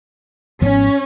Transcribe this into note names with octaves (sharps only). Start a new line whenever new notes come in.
G#1 G#2 F3 B3 C#4